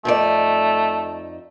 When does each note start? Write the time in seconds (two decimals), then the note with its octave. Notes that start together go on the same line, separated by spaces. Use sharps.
0.05 F2 A3 D#4 D5